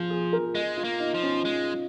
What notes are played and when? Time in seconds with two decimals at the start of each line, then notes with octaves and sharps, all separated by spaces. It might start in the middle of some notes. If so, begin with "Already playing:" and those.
Already playing: F3 F4 G#4
0.10 G#4
0.33 A#4
0.55 G#3 D#5
0.77 F4
0.84 A#3
1.00 D#4
1.14 F3
1.22 C#4
1.45 G#3